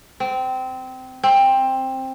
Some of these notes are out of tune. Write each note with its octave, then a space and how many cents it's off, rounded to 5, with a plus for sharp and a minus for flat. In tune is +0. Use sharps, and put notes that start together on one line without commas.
C4 -20
C4 +15